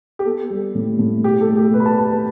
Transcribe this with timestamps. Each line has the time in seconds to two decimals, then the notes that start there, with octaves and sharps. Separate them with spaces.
0.19 G4
0.25 B3 A4
0.50 G3
0.75 A2
0.99 A2
1.24 B2 G4
1.41 A4
1.49 A3
1.57 G4
1.74 B2 B4
1.80 B5
1.86 A5
1.98 A3 A5
2.11 B4